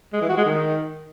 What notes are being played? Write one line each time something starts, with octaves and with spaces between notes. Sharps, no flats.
G#3
E3
F#4
G#3
D#3